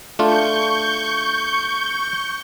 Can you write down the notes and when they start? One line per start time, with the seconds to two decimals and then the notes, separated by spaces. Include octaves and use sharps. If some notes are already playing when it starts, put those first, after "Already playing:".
0.19 A3 D4 F4 C#6 G6